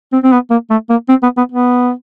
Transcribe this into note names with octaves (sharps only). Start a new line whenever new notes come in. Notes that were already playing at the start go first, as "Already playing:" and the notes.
C4
C4
B3
A#3
A3
A#3
C4
B3
B3
B3